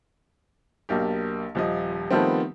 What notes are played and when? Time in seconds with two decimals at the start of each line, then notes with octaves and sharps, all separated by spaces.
0.89 B1 A#3 D4 G4
1.55 D#1 F3 D#5
2.11 D#3 F3 G3 A3 B3 C4